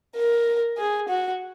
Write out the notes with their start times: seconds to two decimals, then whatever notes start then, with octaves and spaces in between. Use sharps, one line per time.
0.16 A#4
0.78 G#4
1.09 F#4